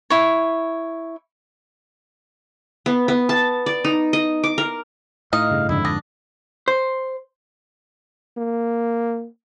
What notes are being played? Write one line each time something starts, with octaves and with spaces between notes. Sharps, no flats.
E4 C#5
B3
B3
A5
D5
D#4
D#5
D6
A#4
A2 D#4 D#5 F5
G2 C#3
F2 G#2 D3 E4
D4 D#6 A#6
C5
A#3